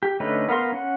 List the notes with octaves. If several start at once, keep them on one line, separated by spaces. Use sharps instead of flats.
G4
D3 A3 C#4 D#4 B4
B3 A#4 F5 C6
C#4 F#5